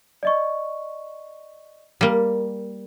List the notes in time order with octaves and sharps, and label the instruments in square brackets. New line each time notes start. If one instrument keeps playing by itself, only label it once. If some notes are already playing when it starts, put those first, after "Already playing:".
[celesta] D5 D#5 C#6
[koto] G3 A#3